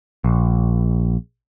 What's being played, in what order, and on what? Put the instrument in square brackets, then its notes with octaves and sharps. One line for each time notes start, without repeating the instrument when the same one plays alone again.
[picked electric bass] A#1